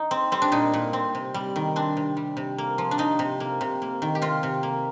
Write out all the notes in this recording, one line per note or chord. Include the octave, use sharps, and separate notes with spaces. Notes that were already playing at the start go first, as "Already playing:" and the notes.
Already playing: D#4
C4
G3 C4
D4
A#2 D#4
A#2
C4
C3
G3
D#3
C4 D4
C3
G3
C3
A#3
F3
D4
C3 D#4
C3
A#3
C3
A#3
D#3
G4
C3 F4
C3
A#3